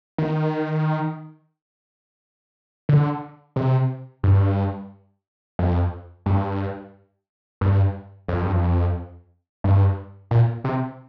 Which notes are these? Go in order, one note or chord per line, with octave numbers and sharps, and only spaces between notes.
D#3
D3
C3
G2
F2
G2
G2
F2
G2
F2
G2
A#2
C3